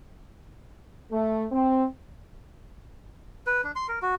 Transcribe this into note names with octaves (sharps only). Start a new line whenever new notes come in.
A3
C4
B4
D4
C6
A#4
F#4